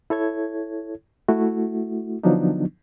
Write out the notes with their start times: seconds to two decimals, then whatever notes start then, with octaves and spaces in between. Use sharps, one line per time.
0.10 E4 A4 C#5 G#6
1.28 A3 E4 F#4
2.23 D3 F3 F#3 B3 D4 D#4